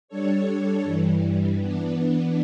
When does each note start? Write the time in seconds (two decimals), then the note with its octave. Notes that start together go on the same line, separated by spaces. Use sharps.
0.08 G3 D4 A4 C#5
0.83 G2 E3 G3
1.58 E3 B3 D4